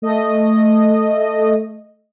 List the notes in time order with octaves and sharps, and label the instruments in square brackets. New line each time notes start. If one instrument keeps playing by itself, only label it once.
[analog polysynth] A3 D#5